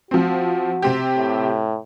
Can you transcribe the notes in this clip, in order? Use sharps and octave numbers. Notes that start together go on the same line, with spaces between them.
F3 C4 F#4
C3 C4 G4
A2